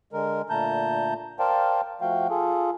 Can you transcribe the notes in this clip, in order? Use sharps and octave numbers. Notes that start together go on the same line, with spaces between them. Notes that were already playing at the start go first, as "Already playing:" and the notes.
D3 G#3 A#4
A#2 D3 A3 A5 A#5 G6
A#4 C5 D5 F5 G5 A5
F3 A3 F#4 F5 G5
F4 G#4 A4